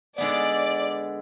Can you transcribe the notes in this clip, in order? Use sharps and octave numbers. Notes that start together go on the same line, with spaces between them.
D3 G#3 B3 D5